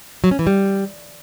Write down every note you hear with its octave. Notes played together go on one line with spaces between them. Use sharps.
F#3
C#4
E3
G3